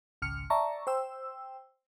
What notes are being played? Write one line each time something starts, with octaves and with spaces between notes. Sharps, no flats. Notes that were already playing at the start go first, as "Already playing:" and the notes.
G#1 C#2 F6 C#7
D5 E5 A5 A#5 C#6
C5 G5 E6